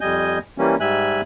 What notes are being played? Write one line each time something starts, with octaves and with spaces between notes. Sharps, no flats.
F2 G3 D#5 G#5 G6
E3 G3 A#3 C#4
G#2 G3 E5 G#5 F#6